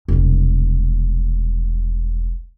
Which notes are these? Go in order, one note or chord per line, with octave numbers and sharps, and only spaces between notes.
E1 C2